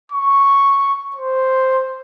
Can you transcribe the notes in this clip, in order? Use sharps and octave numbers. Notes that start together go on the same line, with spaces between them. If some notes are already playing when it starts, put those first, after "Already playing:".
C#6
C5